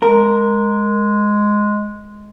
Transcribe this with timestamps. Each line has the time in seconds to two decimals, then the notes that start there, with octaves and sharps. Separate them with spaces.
0.02 G#3 A#4